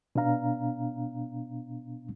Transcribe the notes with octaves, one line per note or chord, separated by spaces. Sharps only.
B2 B3 D4 F5 A#5